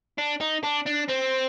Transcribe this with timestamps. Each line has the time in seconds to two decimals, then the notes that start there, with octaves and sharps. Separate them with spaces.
0.18 D4
0.41 D#4
0.64 D4
0.87 D4
1.09 C4